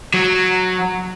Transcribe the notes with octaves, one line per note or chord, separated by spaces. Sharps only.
F#3